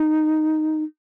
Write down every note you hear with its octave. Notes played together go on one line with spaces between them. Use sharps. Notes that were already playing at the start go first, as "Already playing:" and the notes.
Already playing: D#4